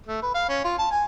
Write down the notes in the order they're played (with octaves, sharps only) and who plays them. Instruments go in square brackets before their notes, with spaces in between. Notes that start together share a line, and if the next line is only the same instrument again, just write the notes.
[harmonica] A3
B4
F5
C#4
F4
A5
G#5